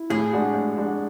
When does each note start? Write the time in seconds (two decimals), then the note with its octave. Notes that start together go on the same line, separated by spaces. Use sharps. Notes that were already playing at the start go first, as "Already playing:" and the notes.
Already playing: E4
0.10 A2 G#4
0.33 G#3 D4 F#4
0.54 A2
0.77 G#3 D4 F#4